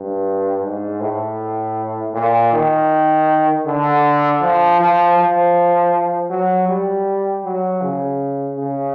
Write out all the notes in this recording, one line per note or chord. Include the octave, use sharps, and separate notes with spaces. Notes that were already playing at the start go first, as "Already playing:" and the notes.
Already playing: G2
G#2
A2
A#2
D#3
D3
F3
F3
F3
F#3
G3
F#3
C#3
C#3